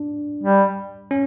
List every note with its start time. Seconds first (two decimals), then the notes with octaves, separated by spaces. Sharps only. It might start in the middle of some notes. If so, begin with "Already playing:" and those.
Already playing: D4
0.44 G3
1.11 C#4